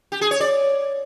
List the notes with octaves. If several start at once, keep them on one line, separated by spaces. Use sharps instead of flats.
G4
G#4
C#5
D5